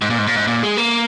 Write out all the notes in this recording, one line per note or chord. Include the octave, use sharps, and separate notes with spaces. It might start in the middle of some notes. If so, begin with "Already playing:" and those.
G#2
A#2
G#2
A#2
G#2
A#2
G#3
A#3